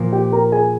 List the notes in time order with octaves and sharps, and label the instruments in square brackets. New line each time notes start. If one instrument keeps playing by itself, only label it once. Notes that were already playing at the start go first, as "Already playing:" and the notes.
Already playing: [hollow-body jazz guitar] A#2 F3 A#3
[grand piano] G4 G5
A#4 A#5
G#4 G#5